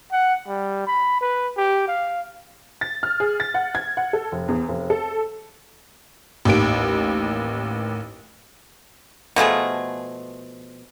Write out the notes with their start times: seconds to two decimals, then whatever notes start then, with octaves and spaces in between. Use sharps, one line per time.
0.12 F#5
0.48 G3
0.87 B5
1.21 B4
1.57 G4
1.88 F5
2.81 A6
3.03 F6
3.20 G#4
3.40 A6
3.54 F#5
3.75 G#6
3.97 F#5
4.13 A4
4.32 F1
4.48 E2
4.69 F1
4.90 A4
6.45 A1 D#2 D7
9.36 B2 F3 A3 G#4